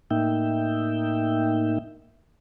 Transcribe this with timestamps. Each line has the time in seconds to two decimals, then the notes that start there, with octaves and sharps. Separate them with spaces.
0.11 A2 A#3 D#4 E5 G5